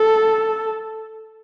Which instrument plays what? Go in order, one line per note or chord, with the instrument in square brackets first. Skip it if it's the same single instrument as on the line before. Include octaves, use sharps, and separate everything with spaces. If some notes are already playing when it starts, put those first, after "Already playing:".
Already playing: [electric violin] A4